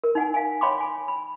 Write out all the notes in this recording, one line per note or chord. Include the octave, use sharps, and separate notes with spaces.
A#4
D#4 F#5 G#5
F5 G#5
C#5 F5 G5 B5 C6 D6
G#5
B5